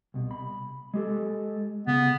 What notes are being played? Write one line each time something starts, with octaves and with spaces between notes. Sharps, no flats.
C2 B2
B5
G#3 G4 A4
C#3 B3